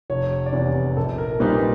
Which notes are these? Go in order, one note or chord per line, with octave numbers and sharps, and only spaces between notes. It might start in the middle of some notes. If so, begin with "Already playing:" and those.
F1 C#5
D5
E2 C3 C#5
A#1 A4
A#4
A#2 G3 C4 D#4 B4